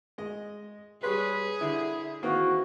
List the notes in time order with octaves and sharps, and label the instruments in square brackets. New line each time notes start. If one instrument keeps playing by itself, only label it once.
[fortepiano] G#3 D#5
[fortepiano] G3 C#5 C6 [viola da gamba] G#4 [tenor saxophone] B4
[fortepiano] D3 [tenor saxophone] E4
[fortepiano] D#3 A#3 C4 [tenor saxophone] E3 [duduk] F#4